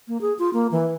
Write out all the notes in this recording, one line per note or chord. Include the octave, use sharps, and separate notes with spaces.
A#3
G#4
F4
A#3
E3